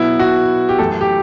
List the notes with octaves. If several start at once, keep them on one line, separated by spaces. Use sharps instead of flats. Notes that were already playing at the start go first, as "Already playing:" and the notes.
Already playing: B2 F#3 B3 E4
F#4
G4
F#2 E3 A3 A4
G4